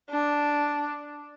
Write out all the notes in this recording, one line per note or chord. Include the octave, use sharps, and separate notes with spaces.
D4